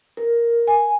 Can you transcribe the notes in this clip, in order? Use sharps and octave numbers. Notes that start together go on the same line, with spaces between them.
A#4
G#5